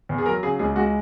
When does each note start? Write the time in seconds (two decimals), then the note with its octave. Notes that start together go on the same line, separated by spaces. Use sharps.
0.09 E2
0.18 G#4
0.26 F#3 A#4
0.43 C#3 G#4
0.59 C#2 G#4
0.76 G#3 F#4